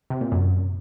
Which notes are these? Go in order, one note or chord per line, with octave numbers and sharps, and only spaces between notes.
C3
A#2
F#2